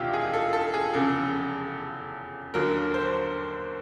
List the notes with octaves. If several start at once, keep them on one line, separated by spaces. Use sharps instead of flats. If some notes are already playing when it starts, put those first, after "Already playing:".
Already playing: E1 D2 C3 D#3 E4 F4 G4
G#4
A4
A4
G#4
F1 E2 C#3 A4
D#2 D3 F#3 A#4
C5